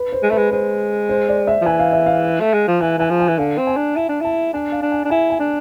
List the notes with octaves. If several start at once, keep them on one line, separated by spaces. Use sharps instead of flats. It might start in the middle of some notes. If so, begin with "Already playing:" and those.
Already playing: B4
C5
G#3
A3 B4
G#3
G#3 C5
C5
D5
E5
F3
E3 G#5
F5
E5
F5
A3
G#3
F3
E3 G#5
E3 G#5
F3
G#5
E3
D3 F5
C4
G#5
D4
E4 A5
D4
E4 A5
D4 G#5
F5
D4
G#5
D4
E4 G#5
G#5
D4